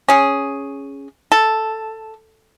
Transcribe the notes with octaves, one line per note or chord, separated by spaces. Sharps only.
C#4 G#4
A4